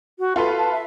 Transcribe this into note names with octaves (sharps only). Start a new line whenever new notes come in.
F#4
F4 A4 B4 C6
A5
E5